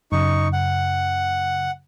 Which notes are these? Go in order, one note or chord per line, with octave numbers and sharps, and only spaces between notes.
F#2 C#3 D#4 C#6
F#5